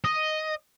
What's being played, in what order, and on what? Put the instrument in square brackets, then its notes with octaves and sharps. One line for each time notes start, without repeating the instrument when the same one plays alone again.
[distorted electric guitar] D#5